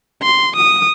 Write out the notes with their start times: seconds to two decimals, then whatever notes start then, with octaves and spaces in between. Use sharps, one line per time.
0.23 C6
0.56 D#6